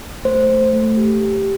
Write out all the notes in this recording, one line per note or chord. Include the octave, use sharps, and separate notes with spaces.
A3 C5
A3
A3
G4
G4